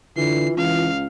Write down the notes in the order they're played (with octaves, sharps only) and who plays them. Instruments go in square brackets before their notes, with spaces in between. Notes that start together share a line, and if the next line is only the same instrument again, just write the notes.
[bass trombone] D3 [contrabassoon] E3 [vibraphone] F4 [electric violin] C7
[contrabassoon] C#2 [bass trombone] E3 [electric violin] F5